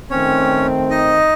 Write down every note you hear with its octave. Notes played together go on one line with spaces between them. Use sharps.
D#3 A3 C4 C#4 C#5
D#4 D#5